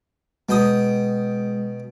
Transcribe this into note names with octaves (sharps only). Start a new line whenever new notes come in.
B2 G#3 G5 D#6